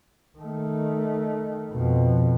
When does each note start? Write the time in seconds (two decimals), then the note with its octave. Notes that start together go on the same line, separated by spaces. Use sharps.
0.39 D#3 A3
1.72 F2 B2